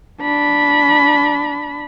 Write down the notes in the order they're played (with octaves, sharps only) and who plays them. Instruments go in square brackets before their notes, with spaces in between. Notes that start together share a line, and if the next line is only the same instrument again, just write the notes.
[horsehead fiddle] D4 B5